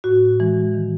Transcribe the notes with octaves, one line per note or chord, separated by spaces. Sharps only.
A2 F#4
E3 G#3
D#3